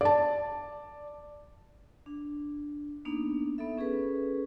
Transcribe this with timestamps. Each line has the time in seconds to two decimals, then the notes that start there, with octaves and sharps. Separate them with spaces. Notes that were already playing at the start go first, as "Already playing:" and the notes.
0.01 D5 A5
2.06 D4
3.05 A#3 B3 D4 D#4
3.58 B3 D#4 A4 E5
3.77 C#4 G#4 A4 B4